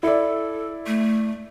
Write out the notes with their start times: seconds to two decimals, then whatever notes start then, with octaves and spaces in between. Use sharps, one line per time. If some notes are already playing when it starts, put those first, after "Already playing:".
0.03 E4 A4 D5
0.87 A3